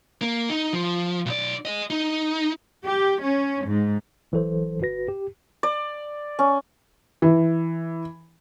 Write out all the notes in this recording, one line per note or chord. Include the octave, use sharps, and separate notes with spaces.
A#3
D#4
F3
B1 D5
G#4 D#5
D#4
G4
C#4
G#2
A1 E3 F#3 A4 C5
G1 F#4 B4 A#6
G4
D5
C#4
E3